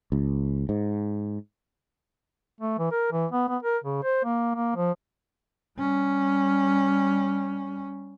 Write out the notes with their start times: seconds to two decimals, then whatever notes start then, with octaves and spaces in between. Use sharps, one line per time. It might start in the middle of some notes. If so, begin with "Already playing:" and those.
0.12 C#2
0.69 G#2
2.61 A3
2.79 E3
2.92 A#4
3.12 E3
3.32 B3
3.49 B3
3.63 A#4
3.84 C#3
4.04 C5
4.24 A#3
4.56 A#3
4.76 F3
5.78 G3 C#4